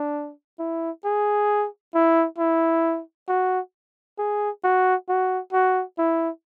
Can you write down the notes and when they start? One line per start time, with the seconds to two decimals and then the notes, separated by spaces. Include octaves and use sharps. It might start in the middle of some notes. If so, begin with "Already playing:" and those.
Already playing: D4
0.59 E4
1.04 G#4
1.94 E4
2.39 E4
3.28 F#4
4.18 G#4
4.64 F#4
5.09 F#4
5.53 F#4
5.98 E4